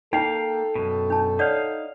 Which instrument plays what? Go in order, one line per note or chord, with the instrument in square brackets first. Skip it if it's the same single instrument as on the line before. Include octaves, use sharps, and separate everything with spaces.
[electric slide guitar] A#3 F5 [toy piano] D#4 [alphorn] A4 [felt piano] G5
[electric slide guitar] F#2 B2
[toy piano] D4 A5
[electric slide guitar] D#4 F5 [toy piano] C#5 D5 F#5